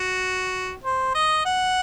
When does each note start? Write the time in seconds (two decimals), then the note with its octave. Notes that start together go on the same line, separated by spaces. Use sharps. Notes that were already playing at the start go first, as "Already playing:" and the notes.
Already playing: F#4
0.85 C5
1.15 D#5
1.46 F#5